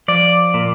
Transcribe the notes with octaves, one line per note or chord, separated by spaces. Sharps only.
F3 D5
A#2